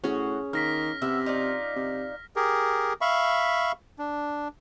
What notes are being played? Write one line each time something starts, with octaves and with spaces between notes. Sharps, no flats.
A2 C#4 F#4 G#4
D#3 A#3 F6 A#6 B6
C3 B3 E5
D#4 F4 D5
C3
G4 G#4 A#4
E5 F5 B5 C#6
D4